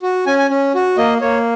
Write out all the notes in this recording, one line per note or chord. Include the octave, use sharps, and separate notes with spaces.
F#4
C#4 G#5
G#5
C#4
F#4
A#3 D#5
A#3 C#5